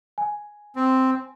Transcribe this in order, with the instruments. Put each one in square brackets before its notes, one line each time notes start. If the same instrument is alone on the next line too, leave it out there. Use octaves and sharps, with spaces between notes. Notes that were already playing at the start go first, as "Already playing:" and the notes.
[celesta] G#5
[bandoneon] C4